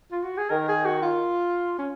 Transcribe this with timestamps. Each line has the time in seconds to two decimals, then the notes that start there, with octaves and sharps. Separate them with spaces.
0.11 F4
0.24 F#4
0.37 G#4
0.50 D#3 A#4
0.68 G#4
0.85 F#4
1.02 F4
1.78 C#4